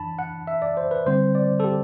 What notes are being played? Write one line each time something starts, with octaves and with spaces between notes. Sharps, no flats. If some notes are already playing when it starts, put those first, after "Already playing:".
Already playing: F#2 E3 D4 A5 B5
F#5
E5
D5
C5
B4
D3 G3 C4 C5
D5
A4
G4